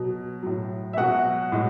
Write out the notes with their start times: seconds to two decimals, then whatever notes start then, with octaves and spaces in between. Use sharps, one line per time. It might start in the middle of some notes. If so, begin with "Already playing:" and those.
Already playing: B2 F#3
0.43 A2 F#3
0.93 E5
0.97 B2 F#3 F#4 F#5
1.52 A2 G#3